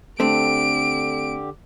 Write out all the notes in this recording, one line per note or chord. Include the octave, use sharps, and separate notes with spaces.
D3 A3 C4 D4 G4 D7